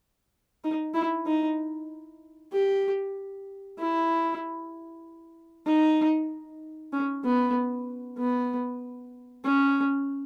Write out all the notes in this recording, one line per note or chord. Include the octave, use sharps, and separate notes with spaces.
D#4
E4
D#4
G4
E4
D#4
C#4
B3
B3
C#4